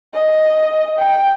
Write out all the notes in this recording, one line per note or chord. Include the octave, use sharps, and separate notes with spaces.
D#5
G5